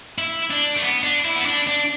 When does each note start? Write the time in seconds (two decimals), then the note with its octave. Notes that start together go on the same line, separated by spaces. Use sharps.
0.18 E4
0.51 D4
0.77 A3
0.82 B3
1.03 D4
1.25 E4
1.35 B3
1.46 D4
1.67 D4